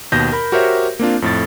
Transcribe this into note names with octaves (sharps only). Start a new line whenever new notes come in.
D#2 B2 G6 A#6
A#4 B5
F#4 G4 A#4 C5 C#5 E5
A#3 C4 D4 F4
F2 A2 A6